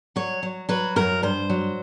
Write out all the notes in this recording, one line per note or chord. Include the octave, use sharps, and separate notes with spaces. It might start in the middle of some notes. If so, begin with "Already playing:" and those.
F#3 C#5
F#3
F#3 B4
F#2 A#4
G2 C5
F#3